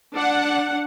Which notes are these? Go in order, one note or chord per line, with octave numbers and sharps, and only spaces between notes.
D4 F#5